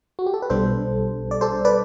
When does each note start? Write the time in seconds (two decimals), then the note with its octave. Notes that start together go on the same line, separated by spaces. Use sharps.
0.19 F#4
0.26 G4
0.34 A4
0.42 B4
0.50 B1 B2 G3 D4 A4 C5
1.31 D5
1.41 A4 C5
1.65 B4 D5